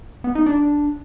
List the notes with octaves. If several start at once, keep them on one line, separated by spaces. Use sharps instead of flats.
B3
D#4
D4